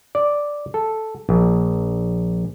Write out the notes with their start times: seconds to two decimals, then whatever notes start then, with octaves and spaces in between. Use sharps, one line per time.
0.15 D5
0.74 A4
1.29 A#1